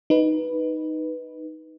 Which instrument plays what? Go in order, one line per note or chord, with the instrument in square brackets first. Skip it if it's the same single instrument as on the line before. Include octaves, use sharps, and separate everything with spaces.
[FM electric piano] D#4 B4